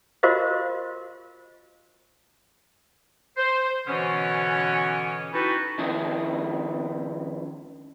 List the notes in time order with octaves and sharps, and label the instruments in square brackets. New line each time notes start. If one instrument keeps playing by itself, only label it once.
[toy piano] F4 F#4 A#4 C5 D#5 F5
[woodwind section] C5
B2 D3 E3 B3 C#4
D#4 E4 F#4 G4 A4 B4
[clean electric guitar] F2 D#3 C#4 E4 D#5